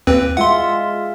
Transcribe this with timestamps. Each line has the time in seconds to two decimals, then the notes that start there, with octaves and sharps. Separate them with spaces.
0.07 D#2 C4 B4
0.37 G#3 F4 E5 F#5 C6